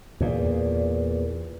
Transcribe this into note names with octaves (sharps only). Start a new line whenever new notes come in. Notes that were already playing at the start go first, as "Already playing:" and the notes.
E2 A#2